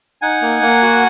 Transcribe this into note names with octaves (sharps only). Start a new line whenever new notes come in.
D#4 F#5 G#5
A#3
A#3
F#4